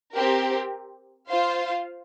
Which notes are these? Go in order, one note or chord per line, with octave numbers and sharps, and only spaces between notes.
C4 G4 A#4
F4 C5 F5